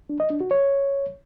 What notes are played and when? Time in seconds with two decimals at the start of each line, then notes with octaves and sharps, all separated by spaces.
0.09 D4
0.20 D#5
0.30 D4
0.40 F#4
0.51 C#5